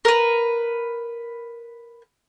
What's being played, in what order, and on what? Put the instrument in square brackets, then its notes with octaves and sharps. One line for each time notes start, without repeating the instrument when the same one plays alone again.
[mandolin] A#4 B4